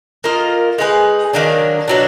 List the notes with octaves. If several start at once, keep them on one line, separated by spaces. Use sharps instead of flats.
A#3 F4 A#4 D#5
G#3 D#4 G#4 B4
D#3 F#3 A#3 D4
B2 F#3 D4